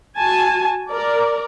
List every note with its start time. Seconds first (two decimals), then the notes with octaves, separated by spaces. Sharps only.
0.17 F#4 G#5 A5
0.91 A#4 D5